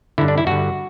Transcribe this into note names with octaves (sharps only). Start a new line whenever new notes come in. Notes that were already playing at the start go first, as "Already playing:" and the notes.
G2 D3 E4
D4
E4
G2 D3 F#4